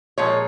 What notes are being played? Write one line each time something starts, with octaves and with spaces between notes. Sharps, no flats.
A#2 F3 G#3 C#5